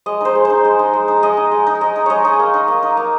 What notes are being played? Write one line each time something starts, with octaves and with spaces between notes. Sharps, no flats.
G#3 D#5
D#4 C5
G#3
D#4 C5
G#3
D#4
G#3
D#4
G#3 D#5
D#4
G#3
D#4
G#3 D#5
D#4
G#3 C#5 D#5
D#4
A#3
D#4
A#3
D#4
A#3